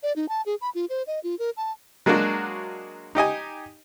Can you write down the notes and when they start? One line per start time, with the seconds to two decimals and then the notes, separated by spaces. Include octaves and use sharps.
0.03 D5
0.16 D#4
0.29 A5
0.46 G#4
0.61 B5
0.75 F4
0.90 C5
1.07 D#5
1.24 F4
1.39 A#4
1.57 A5
2.06 F#3 G#3 A#3 D4 F#4
3.15 D#4 G4 D#5 G#5